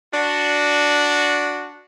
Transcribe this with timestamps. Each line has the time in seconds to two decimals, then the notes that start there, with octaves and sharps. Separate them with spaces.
0.13 D4 F#4